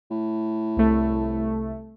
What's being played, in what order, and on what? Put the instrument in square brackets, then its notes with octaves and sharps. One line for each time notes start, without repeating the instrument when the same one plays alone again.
[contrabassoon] A2
[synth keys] C2 A3